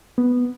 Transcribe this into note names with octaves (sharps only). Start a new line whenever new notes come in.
B3